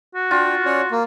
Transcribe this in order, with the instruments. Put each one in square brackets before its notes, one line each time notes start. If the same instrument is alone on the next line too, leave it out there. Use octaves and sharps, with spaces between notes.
[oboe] F#4
[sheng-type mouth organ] D4 G5 [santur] F4
[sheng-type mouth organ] C#4 C#5 D5
A#3